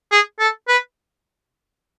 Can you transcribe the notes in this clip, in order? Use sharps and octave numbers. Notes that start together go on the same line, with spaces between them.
G#4
A4
B4